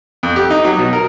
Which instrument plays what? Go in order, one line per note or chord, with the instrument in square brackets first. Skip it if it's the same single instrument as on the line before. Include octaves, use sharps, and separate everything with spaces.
[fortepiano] F2
G4
D#4
F#3
B2
A#4